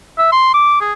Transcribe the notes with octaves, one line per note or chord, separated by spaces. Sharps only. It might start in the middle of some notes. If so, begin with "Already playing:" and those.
E5
C6
D6
G#4